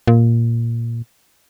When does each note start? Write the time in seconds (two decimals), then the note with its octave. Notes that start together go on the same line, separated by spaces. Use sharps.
0.08 A#2